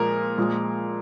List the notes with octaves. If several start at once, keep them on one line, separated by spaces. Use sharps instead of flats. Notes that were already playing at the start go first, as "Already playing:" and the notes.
Already playing: A#2 F3 G#3 A#4
A#2 F3 G#3